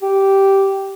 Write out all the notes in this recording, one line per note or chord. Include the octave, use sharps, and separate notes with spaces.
G4